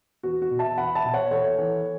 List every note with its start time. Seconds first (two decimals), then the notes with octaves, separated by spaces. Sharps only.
0.23 E2 F#4
0.42 F#4
0.51 B2
0.59 E5 A5
0.78 E2 F#5 B5
0.95 E5 A5
1.05 B2
1.14 C#5 F#5
1.31 E2 A4 C#5
1.58 E3